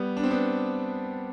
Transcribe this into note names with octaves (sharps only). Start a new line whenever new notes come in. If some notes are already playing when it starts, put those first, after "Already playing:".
Already playing: G3 B3
D4
C4
B3 D4